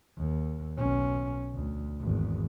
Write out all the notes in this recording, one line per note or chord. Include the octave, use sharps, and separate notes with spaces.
D#2
B1 C#4
D2
G#1 E2